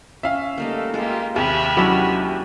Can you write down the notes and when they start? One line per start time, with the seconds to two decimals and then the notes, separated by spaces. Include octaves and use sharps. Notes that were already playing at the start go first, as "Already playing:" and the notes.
0.23 C#4 E5 F5
0.58 G3 A3 A#3 D#4 A4
0.94 G#3 A#3 F4 G4 A4
1.36 D#2 C3 G#4 E5 A5 B5 F6
1.77 F#3 G#3 C#4 D4 E4